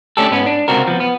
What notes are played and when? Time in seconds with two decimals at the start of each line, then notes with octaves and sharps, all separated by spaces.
0.17 A3 C#4 D4 G4 A4
0.31 G#2 B3 C#4
0.46 D4
0.68 C#2 F#2 C3 C4 F#4 A#4
0.87 F3 B3
1.00 B3